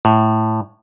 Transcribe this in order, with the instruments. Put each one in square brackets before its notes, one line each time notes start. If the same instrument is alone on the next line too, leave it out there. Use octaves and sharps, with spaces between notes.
[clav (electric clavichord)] A2